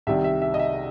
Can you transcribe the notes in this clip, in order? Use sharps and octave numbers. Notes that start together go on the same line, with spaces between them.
C2 C3 D#3 E5
E5
E5
D#5
E5